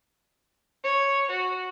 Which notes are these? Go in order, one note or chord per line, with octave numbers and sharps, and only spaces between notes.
C#5
F#4